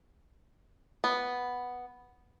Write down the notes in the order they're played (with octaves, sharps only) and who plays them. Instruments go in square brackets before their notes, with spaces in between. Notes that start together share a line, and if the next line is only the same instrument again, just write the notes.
[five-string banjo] B3